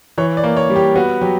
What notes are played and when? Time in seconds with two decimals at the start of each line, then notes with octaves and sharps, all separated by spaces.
0.18 E3 C#5
0.37 D5
0.44 A#3
0.57 C#5
0.70 G3
0.76 G4
0.96 B3 F#4
1.21 F#3 G4